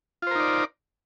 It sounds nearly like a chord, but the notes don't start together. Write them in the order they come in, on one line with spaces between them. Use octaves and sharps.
F4 C5 A#4 D#4 D5